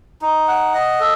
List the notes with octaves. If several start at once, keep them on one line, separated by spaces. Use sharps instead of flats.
D#4
F#5
D#5
A4